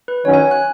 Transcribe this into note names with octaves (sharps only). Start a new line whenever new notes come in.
B4
D#3 F#3 C#4 C#5
G#5
F#6